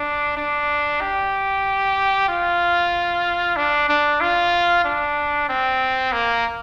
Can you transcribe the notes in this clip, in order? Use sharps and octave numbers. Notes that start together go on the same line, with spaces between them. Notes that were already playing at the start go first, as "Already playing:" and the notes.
Already playing: D4
D4
G4
F4
D4
D4
F4
D4
C4
A#3